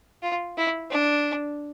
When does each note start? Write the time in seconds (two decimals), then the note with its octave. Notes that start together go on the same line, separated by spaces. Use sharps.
0.23 F4
0.58 E4
0.91 D4